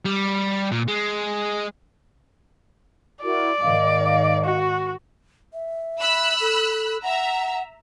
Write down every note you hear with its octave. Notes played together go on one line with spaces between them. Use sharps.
G3
A#2
G#3
E4 F#4 A#4 D5
G#2 D#3 D#5 F5
F#4
E5
B5 E6 F#6
A4
E5 F#5 A#5